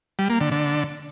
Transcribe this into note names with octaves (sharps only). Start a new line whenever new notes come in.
G3
A#3
D3
D3